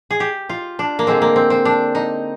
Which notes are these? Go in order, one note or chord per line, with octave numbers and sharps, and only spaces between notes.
G#4
G4
F4
D4
A#3
D3 G#3 C4
A#3
C4
C4
D4
D#4